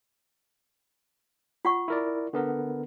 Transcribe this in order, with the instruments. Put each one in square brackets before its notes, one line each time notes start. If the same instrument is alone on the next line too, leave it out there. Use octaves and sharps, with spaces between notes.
[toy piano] F4 F#5 C#6
[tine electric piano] E4 A#4 D5
D3 B3 A#4